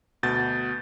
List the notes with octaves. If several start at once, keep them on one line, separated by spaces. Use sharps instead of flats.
D2 B2 G6 A6